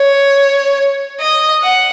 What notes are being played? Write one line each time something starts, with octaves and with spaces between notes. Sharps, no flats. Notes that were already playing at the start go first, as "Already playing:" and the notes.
Already playing: C#5
D#5
F#5